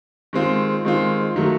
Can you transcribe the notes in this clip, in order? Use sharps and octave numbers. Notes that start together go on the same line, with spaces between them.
D#3 G#3 C4 F4
D#3 G#3 C4 F4
D#3 F#3 A3